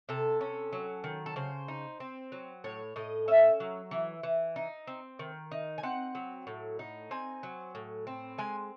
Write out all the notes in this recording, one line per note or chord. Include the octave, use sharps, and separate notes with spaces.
C3 A4
C#4
F#3
D#3
A4
C#3 C5
D#4
C4
F#3
A2 C#5
A2 D#5
C#4 E5
F#3
E3
E3
D#4
C4
D#3
D#4
G#5
C4 F#5
F#3
A2
D#4
C4 G#5
F#3
A2
C4
G#3 G#5